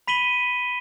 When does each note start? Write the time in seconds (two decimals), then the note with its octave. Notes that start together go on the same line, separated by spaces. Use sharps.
0.07 B5 B6 D#7 F#7 G7